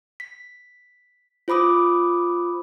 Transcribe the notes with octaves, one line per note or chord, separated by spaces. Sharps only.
B6
F4 C5 B5 D6 D#6